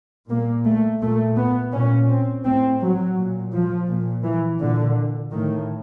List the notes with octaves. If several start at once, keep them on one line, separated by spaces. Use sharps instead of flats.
A#2 A#3
A3
A#2 A3
B3
A#2 C#4
C4
A2 C4
F#3
A#2
F3
A#2
E3
A#2 D3
A2 D#3